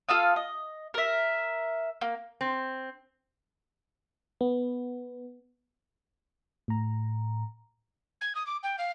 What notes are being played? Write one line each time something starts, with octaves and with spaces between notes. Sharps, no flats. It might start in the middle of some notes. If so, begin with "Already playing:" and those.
F4 A4 F5 D#6
D#5
A#4 E5
A#3
C4
B3
A2 A#5
G#6
D#6
D6
G5
F5